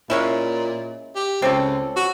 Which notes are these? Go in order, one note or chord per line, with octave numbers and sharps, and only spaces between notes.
A#2 G#3 C#4 E4
G4
C#2 C4 C#4 A4
F#4